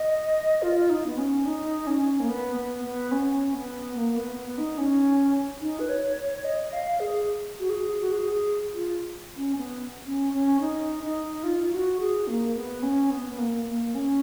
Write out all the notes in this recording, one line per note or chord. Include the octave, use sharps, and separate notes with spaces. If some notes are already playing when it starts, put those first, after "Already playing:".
Already playing: D#5
F4
D#4
B3
C#4
D#4
C#4
A#3
B3
B3
B3
C#4
B3
A#3
B3
B3
D#4
C#4
D#4
B4
C#5
C#5
C#5
D#5
F5
G#4
F#4
G#4
F#4
G#4
G#4
F4
C#4
B3
C#4
C#4
D#4
D#4
F4
F4
F#4
G#4
A#3
B3
C#4
B3
B3
A#3
A#3
C#4